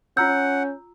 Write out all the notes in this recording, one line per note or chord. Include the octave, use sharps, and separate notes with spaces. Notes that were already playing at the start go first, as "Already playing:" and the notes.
C#4 F4 F#5 A#5 E6 G6